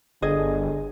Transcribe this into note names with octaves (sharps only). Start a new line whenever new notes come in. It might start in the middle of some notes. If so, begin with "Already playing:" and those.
G1 D3 G#4 D#5